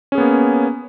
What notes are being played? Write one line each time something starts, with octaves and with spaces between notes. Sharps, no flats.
A#3 B3 C#4 G#4